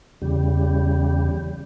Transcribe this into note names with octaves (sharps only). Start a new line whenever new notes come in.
E2 C#3 G3